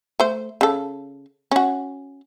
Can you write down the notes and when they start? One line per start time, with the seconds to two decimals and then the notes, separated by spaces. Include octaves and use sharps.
0.20 A3 C5
0.61 C#3 A4
1.51 C#4 F#4